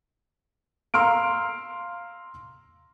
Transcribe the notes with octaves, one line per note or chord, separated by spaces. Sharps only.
F5 A#5 C6 E6 F6 D7